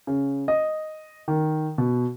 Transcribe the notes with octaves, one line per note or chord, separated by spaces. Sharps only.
C#3
D#5
D#3
B2